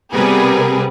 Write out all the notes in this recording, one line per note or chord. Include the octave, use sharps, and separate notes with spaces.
C3 G3 B3 G#4 A#4 B4